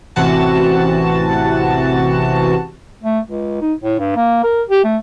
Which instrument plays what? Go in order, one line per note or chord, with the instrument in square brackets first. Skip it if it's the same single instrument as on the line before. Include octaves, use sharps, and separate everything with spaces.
[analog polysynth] A1 C3 E3 F#4 A5
[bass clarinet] A3
C#2
D#4
A2
G2
A#3
A#4
G4
A3